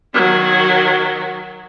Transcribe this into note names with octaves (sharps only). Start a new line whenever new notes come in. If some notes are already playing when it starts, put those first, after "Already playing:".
D#3 F#3